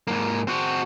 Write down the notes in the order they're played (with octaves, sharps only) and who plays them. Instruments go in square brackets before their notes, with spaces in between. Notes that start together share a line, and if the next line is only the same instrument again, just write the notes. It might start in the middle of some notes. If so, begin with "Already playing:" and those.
[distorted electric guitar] G#2 A#3
C4 F#4